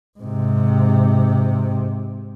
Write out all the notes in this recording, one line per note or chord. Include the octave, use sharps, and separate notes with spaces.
G#2 C3